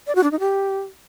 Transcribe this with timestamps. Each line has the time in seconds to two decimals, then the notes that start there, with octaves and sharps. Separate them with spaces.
0.07 D5
0.15 F#4
0.23 D4
0.32 D#4
0.40 G4